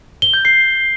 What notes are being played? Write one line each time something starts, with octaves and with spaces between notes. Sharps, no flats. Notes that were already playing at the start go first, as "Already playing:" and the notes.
G7
G6
C7